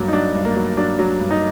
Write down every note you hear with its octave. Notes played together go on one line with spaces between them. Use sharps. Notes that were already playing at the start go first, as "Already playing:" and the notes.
Already playing: G2 F#3 A#3
D#4
F#3 D4
G2
A#3
F#3
F#3 D4
F#3
G2
D#4